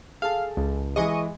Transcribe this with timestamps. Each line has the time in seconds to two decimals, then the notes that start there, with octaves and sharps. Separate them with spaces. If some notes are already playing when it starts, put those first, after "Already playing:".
0.22 G#4 A4 F5 A5
0.57 C#2
0.96 E3 G#3 D#5 C#6 D#6